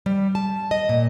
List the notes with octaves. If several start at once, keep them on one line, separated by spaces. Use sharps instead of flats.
G3
A5
D#5
A#2